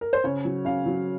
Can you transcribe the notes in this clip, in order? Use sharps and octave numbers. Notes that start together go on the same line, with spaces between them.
A#4
C5
C#3 C#5
F#3
C#3 F5
F#3